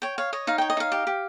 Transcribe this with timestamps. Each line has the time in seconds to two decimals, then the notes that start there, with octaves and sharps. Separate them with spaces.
0.02 C#5 G5
0.18 C#5 F5
0.33 C#5 D#5
0.47 D#4 F5
0.58 C#5 G5
0.70 D#5
0.77 D#4 F5
0.92 G4
1.07 G4